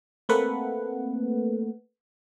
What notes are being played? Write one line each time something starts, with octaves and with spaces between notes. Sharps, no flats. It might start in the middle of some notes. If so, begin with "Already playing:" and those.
A3 A#3 C4 A4 B4 F#5